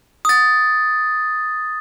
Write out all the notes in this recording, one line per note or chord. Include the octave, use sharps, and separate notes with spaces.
D#6 A6